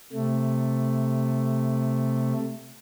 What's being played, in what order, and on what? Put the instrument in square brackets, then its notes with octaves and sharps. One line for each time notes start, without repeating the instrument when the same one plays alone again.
[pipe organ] C3 A3